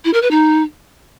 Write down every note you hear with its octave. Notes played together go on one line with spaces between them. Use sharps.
E4
A#4
B4
D#4